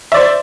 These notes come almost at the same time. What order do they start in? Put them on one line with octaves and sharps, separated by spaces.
E5 D5 C5